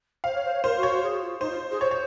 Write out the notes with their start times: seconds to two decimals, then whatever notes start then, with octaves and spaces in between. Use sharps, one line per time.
0.24 C5 F5
0.34 C#5
0.44 C5
0.54 C#5
0.63 A#4 C5
0.77 F#4
0.83 C#5
0.90 F#4
1.03 G#4
1.22 F4
1.41 D#4 C5
1.51 F4
1.71 G#4
1.81 C5 C#5
1.91 C#5